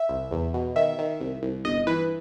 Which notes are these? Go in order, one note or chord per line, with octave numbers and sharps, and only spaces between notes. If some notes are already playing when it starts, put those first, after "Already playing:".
Already playing: E5
C2
E2
B2
D#3 E5
D#3
C2
C2
G1 D#5
E3 B4